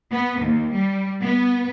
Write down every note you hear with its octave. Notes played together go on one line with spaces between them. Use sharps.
B3
D#2
G3
B3